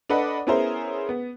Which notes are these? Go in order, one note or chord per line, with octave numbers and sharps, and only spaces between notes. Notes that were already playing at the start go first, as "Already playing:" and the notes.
D4 A4 B4 D#5 F#5
B3 C#4 E4 G#4 A#4 C5
B3